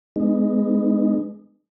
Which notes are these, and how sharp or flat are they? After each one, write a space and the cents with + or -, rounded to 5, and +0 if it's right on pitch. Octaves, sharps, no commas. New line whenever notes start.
G#3 +10 B3 +25 D#4 -15